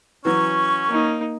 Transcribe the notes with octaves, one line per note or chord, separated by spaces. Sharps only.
E3 F#3 C#4 C#6
A#3 D#4